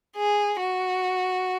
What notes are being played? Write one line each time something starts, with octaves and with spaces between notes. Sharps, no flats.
G#4
F#4